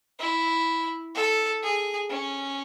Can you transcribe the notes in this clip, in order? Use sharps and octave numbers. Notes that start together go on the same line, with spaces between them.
E4
A4
G#4
C#4